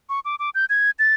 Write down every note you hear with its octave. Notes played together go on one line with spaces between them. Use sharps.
C#6
D6
D6
G6
G#6
A6